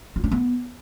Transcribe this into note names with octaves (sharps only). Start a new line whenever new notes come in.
F4
D4
B3